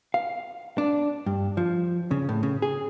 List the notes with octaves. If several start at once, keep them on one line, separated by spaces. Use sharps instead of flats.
F5
D4
G2
F3
C#3
A2
C#3
G#4